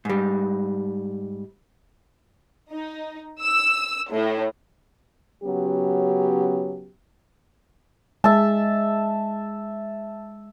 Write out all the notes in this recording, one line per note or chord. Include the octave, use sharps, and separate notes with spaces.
G#2 G3
D#4
E6
A2
C#3 F#3 B3 C#4 G4
G#3 E5 A5